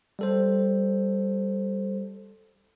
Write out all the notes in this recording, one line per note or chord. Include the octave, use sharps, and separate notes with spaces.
G3 A4 C5